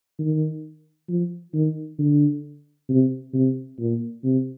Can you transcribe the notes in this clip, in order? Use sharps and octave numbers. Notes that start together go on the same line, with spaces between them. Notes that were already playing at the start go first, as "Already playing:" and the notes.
D#3
F3
D#3
D3
C3
C3
A#2
C3